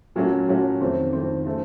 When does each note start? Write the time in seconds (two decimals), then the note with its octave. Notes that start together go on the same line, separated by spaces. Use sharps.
0.16 A#2 F#3 A3 C#4 F#4
0.48 A#2 F#3 A3 C#4 F#4
0.80 F2 D#3 A3 C4
1.13 F2 D#3 A3 C4
1.46 C#3 A3 C4